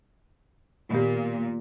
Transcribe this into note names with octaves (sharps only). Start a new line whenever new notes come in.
A#2 D#3 B3 G4